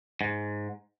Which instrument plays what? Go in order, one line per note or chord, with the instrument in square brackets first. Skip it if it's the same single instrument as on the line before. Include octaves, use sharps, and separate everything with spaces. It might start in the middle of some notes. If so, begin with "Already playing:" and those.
[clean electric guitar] G#2